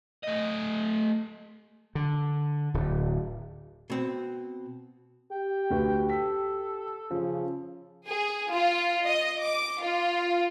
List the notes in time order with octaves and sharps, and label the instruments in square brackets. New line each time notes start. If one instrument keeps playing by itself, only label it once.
[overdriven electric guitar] A3 D#5
[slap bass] D3
D1
[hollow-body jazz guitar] B2 C4
[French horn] G4 [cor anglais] G5
[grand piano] D2 F#4 B4
[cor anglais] A4 [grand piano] B6
[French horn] C#3 [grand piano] F3
[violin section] G#4
F4
D#5
D6
F4